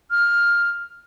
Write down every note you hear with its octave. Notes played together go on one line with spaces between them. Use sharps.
F6